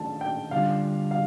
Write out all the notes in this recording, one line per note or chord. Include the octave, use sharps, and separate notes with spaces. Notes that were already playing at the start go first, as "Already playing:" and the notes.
Already playing: D#3 A3 D4 F4 A5
G5
D3 G3 D4 F4 F5
F5